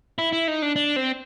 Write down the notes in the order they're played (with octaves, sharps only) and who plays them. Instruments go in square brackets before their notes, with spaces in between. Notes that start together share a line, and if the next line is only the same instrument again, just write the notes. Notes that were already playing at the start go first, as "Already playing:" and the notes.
[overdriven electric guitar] E4
E4
D#4
D4
D4
C4